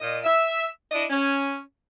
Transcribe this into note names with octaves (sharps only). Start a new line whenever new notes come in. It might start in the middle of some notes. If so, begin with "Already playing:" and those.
A#2 D#5
E5
D4 E4 D5 D#5
C#4